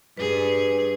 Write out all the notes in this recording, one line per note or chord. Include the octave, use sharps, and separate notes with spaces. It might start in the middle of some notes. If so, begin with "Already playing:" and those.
G2 G#4 B4